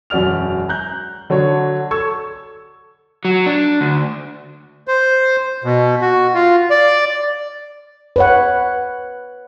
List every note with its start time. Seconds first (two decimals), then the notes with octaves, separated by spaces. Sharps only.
0.10 E1 F#2 F#4 D5 F6 F7
0.69 A#5 F#6 G6
1.30 D3 F#3 D4 C#5
1.91 A4 C#6 E6 G#6
3.25 F#3
3.46 D4
3.81 D2
4.88 C5
5.64 B2
6.01 F#4
6.34 F4
6.70 D5
8.16 B4 C#5 F#5